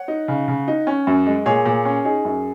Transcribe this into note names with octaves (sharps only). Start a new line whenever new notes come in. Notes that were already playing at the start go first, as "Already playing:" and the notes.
Already playing: C#5 F#5
D#4
C#3
C#3
D#4
C#4
F#2
G#3
A#2 G#4 C#5
A#2
C#4
D#4 G#4
F#2